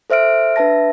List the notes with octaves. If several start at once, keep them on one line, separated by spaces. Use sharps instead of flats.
A4 C5 E5 F6 D7
D4 B4 E5 A5 A#6